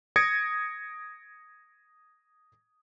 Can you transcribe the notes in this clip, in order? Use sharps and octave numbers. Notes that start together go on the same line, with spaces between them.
D#6 G#6 A#6 C#7 D7